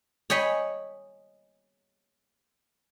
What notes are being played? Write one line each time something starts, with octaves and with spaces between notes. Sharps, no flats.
C#5 D#5 G5 G#5 B5